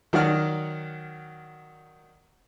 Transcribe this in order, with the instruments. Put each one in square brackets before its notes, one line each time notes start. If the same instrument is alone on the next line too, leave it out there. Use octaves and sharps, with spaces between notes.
[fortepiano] D#3 F#3 D5 F#5 F6